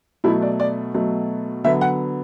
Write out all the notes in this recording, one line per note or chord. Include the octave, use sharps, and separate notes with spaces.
B2 F#3 A3 E4
D5
D5
B2 F#3 A3
D3 F#3 B3 E5
F#5